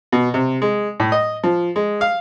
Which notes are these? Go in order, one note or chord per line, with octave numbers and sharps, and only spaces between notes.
B2
C3
G#3
A2
D#5
F3
G#3
F5